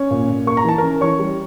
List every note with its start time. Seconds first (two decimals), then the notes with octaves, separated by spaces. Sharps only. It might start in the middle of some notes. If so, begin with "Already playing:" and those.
Already playing: C#4 C#5
0.11 A#2
0.30 A#2
0.47 A#3 C#6
0.57 A#5
0.65 E3 A5
0.78 C#4 A#4 A#5
1.01 E3 C#5 C#6
1.19 G3